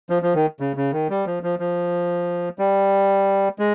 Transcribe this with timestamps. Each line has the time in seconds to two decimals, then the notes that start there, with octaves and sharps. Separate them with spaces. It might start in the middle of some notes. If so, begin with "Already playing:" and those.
0.10 F3
0.22 F3
0.35 D#3
0.60 C#3
0.76 C#3
0.93 D#3
1.10 G3
1.26 F3
1.43 F3
1.59 F3
2.59 G3
3.59 G#3